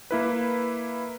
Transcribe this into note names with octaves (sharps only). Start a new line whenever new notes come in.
A#3 E4 B4